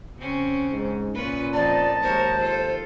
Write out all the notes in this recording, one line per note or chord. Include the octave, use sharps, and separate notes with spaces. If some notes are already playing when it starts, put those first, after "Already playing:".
C#3 C4 C#4
G#2
A#2 C#4 F4 B4
F2 D#4 D5 A5
D#2 G#3 A#4 C5 C#5
F4 A4